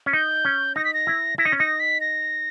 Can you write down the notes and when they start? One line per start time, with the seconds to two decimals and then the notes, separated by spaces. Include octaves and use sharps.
0.06 C#4
0.13 D#4 G6
0.45 C#4
0.76 D#4 A#6
0.85 B6
0.94 A#6
1.07 E4
1.38 E4 A#6
1.45 D#4
1.52 C#4
1.58 D#4 A#6
1.80 B6
2.01 A#6